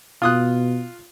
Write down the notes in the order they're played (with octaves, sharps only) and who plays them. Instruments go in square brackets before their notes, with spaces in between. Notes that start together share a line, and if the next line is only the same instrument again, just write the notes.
[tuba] B2 [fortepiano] F4 D#6 F#6